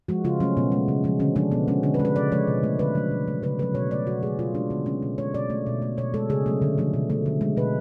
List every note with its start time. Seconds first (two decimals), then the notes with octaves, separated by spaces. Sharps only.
0.08 F3 G#3 F#4
0.24 C#3 F4
0.40 F#3 A3 C#4
0.57 B2 B3
0.72 G#3
0.88 C#3
1.04 F3 G#3
1.20 D3 C#4
1.36 F3 G#3 D4
1.51 B2 B3
1.68 G#3 C#4
1.83 D3 D4
1.94 B4
1.99 G#3
2.05 B4
2.16 C#3 D5
2.31 F3 G#3 C#5
2.47 B2
2.63 A3
2.79 D3 B4
2.95 F#3 A3
3.11 B2
3.27 F#3 A3
3.43 C#3 B4
3.59 F#3 A3 B4
3.74 B2 C#5
3.91 A3 D5
4.07 B2 F#4
4.23 F#3 A3 G#4
4.39 B2 F4
4.54 G#3 D4
4.70 D3 B3
4.86 G#3 C#4
5.03 B2
5.18 G#3 C#5
5.34 B2 D5
5.50 A3
5.67 B2
5.82 A3
5.97 B2 C#5
6.14 G#3 A4
6.30 C#3 G#4
6.46 F#3 A3
6.62 D3
6.78 F3 A3
6.94 B2
7.10 A3
7.26 D3
7.41 G#3
7.57 B2 B4